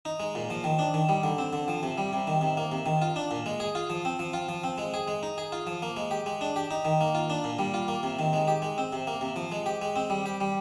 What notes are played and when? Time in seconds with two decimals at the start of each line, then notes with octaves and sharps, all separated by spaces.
0.05 D#4
0.20 G#3
0.35 A#2
0.50 F3
0.64 D#3
0.79 D4
0.94 D#3
1.09 G3
1.23 D3
1.38 C4
1.53 D3
1.68 F3
1.83 C3
1.98 G3
2.13 C3
2.27 D#3
2.41 C3
2.57 A#3
2.72 C3
2.86 D#3
3.02 F4
3.16 D4
3.31 A#2
3.46 G#3
3.60 G#4
3.75 F4
3.90 F3
4.05 C4
4.19 F3
4.34 F4
4.49 F3
4.64 C4
4.78 G#3
4.94 G#4
5.08 G#3
5.23 D#4
5.38 G#4
5.52 F4
5.67 F3
5.82 A#3
5.96 G#3
6.11 G4
6.26 G#3
6.41 D4
6.56 G4
6.71 D#4
6.85 D#3
7.01 A#3
7.15 F4
7.30 D4
7.44 A#2
7.59 G3
7.74 F4
7.88 A#3
8.03 C3
8.19 D#3
8.33 G#3
8.48 G4
8.62 G#3
8.78 C4
8.93 C3
9.07 A#3
9.21 C3
9.36 F3
9.52 G#3
9.66 G4
9.82 G#3
9.96 C4
10.10 G3
10.26 G4
10.41 G3